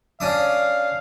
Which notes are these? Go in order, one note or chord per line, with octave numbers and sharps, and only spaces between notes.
C#4 D4 F5 D#6